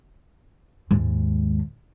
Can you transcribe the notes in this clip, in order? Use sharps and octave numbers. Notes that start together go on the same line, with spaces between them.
D#2 G#2